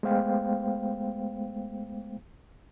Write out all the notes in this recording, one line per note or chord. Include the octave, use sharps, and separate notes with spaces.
G#3 A3 B3 C5 F5 G5